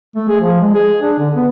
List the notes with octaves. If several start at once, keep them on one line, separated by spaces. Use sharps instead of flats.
A3
G#4
F3
G#3
G#4
D4
D3
B3